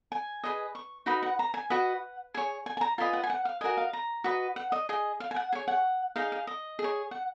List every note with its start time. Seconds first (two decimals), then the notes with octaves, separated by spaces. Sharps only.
0.12 G#5
0.44 G#4 B4 D#5
0.75 C#6
1.06 D#4 F#4 B4 D#5 B5
1.22 F#5
1.39 A#5
1.54 G#5
1.70 F#4 B4 D#5 F#5
2.34 G#4 C#5 G#5
2.66 G#5
2.77 G#5
2.81 A#5
2.98 F4 B4 D#5 G#5
3.13 F#5
3.23 G#5
3.30 F#5
3.45 F5
3.61 F#4 A#4 D#5 G#5
3.77 F5
3.93 A#5
4.24 F#4 B4 D#5
4.56 F#5
4.72 D#5
4.89 G#4 D#5
5.20 F5
5.31 G#5
5.36 F#5
5.52 G#4 C#5 G#5
5.68 F#5
6.16 D#4 G#4 D#5 F5
6.32 F5
6.47 D#5
6.79 G#4
6.84 C#5
7.11 F#5